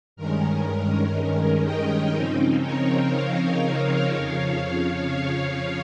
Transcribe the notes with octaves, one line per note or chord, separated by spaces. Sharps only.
G2 D#3 G#3 C#4 A#4
A#4
D#5 G5
C#3 F3 C4 D#4
A#4 C#5
C#5 F5
F2 C#3 F3 C#5 F5
C#5 F5